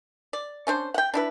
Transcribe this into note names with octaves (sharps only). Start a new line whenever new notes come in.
D5
C#4 D4 C5
F#5 G5
D4 E4 B4